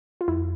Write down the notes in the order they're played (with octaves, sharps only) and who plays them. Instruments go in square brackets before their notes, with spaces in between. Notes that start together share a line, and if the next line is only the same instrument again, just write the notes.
[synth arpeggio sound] F4
[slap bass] F2 [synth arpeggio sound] E4